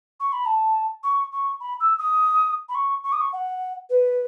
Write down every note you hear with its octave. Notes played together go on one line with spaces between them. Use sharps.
C#6
B5
A5
C#6
C#6
B5
E6
D#6
B5
C#6
C#6
D#6
C#6
F#5
B4